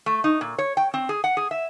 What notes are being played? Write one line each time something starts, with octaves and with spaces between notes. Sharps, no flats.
A3
D#4
A#2
C#5
G5
C4
G#4
F#5
G#4
E5